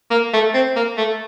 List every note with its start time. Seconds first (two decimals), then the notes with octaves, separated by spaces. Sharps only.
0.11 A#3
0.33 A3
0.54 C4
0.76 A#3
0.97 A3